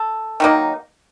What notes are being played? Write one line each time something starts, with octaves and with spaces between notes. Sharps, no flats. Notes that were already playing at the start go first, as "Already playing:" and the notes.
Already playing: A4
D#3 F#3 A#3 D#4